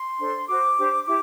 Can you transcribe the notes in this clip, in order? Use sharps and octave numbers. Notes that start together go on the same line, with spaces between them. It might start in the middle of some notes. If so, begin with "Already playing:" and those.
Already playing: C6
D4 A4 C5
F#4 C5 D6
D4 G4 C5
E4 G4 D6